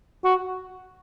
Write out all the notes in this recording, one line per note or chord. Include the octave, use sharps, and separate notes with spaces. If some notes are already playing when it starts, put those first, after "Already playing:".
F#4